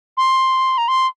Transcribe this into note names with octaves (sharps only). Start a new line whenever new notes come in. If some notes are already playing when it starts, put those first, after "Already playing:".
C6
A#5
C6